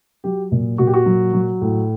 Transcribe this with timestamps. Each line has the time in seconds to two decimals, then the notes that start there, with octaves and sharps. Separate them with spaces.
0.24 F#3 G4
0.52 A#2
0.78 A#2 F#4
0.87 G4
0.94 F#4
1.06 F#3
1.33 F#3
1.62 A2